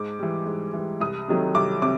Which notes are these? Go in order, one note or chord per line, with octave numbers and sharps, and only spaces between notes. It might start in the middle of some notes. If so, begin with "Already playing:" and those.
Already playing: G#2 D6
E3 G3
G#2
E3 G3
C2 D#6
C3 D#3 F#3 A3
C2 D6
C3 D6